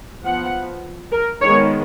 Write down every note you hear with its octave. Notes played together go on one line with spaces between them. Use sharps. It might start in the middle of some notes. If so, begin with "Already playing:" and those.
F3 B3 F#5
A#4
D#3 G#3 B3 C#5